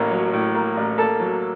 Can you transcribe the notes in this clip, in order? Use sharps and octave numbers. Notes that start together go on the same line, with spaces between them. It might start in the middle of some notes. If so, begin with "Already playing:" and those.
Already playing: A1 A2 A#3
F#3
A2
A#3
A1
A#3 A4 A5
F#3